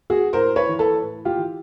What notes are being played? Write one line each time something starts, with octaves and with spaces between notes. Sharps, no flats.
F#4 G#4
A2 A#4 C5
B4 C#5
E3
A4 B4
A2
F4 G4
E3